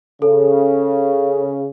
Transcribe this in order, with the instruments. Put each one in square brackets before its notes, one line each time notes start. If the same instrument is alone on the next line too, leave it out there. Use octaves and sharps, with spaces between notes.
[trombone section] C#3 [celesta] A4